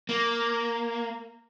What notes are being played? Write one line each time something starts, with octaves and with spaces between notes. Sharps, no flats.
A#3